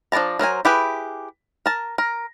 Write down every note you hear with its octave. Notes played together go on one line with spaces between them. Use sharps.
F3 D4 A#4 A5 A#5
F#3 A#4 C5 G#5
E4 G4 G#4 B4
A#4 A5
A#4